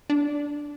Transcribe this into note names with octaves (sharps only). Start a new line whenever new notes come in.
D4